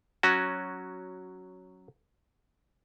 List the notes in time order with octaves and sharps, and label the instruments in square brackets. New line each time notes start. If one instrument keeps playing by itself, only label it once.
[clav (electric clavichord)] F#3 C#4 F#4